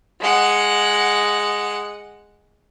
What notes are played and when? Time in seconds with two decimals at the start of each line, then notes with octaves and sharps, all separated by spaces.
0.21 G#3 F#5